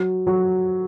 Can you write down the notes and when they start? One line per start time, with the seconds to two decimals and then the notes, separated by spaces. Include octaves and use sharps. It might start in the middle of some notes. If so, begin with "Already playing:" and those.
Already playing: F#3
0.27 F#3